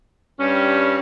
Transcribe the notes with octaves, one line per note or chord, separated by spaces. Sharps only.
G2 G3 C#4